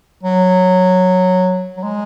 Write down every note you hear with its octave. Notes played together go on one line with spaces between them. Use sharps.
F#3
F#3
G#3